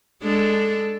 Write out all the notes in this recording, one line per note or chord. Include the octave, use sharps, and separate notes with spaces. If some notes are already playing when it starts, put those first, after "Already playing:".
G#3 D4 A4